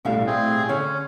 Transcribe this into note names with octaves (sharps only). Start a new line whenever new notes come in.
B1 A2 G3 A4 E5 F5
C4 G#4
D3 C#4 G#4 C#5 E5